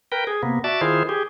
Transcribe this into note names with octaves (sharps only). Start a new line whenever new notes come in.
A#4 B4 G5
G#4
C3 A#3 B3
F#4 D5 E5 A5
D#3 E4 F4 G#4 C5
G4 G#4